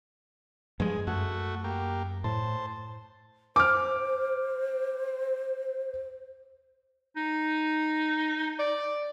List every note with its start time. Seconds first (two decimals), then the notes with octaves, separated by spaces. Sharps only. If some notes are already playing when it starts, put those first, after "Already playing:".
0.80 G2 F3 G#3 G#4
1.07 F#2 A3 F#4
1.64 A#3 G4
2.24 A2 C5 A5
3.56 C5 D6 F6
7.16 D#4
8.59 D5